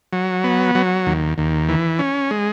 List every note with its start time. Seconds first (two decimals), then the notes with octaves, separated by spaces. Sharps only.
0.13 F#3
0.44 B3
0.75 F#3
1.07 D#2
1.38 D#2
1.69 E3
1.99 C#4
2.31 G#3